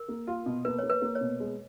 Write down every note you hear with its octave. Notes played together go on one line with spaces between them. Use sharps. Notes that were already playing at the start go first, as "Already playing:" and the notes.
Already playing: A#4
A#3
F4
B2
A#3 B4
A#3 C#5
B4
A#3
C#5
B2
G#3